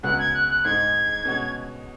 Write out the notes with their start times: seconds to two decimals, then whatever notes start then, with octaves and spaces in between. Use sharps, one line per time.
0.03 C#2 C#3 G#3 B3 F#4 F#6
0.19 G#6
0.34 F#6
0.49 F#6
0.65 G#2 G#3 D#4 G#6
1.25 B2 G#3 C#4 F#4